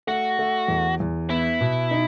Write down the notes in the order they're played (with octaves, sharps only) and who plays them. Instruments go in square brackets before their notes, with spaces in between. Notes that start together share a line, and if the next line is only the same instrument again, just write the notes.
[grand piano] A3 [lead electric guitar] F#4
[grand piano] A3
E2
E2
[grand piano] B3 [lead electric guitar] E4
[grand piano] B2
D#4